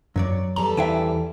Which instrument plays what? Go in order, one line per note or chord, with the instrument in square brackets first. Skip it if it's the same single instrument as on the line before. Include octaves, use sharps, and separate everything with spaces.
[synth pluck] F#2 [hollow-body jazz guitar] F#3 C#5 D5
[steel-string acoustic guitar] E2 G3 A4 [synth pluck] A#5
[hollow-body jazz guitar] E3 E4 C5 [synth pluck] E5 G5 D7